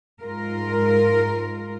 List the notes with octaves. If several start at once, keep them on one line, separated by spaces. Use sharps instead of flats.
G#2 F4 A#4